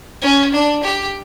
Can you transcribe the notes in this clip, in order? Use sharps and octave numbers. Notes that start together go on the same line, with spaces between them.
C#4
D4
G4